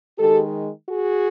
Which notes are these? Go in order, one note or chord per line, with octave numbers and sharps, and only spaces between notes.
D#3 G#3 G4 A4
F#4 G#4